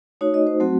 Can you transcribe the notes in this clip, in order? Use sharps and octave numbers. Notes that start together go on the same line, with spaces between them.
A3 D#4 F#4 C#5
D#5
C5
F#3 A3 C4 F#4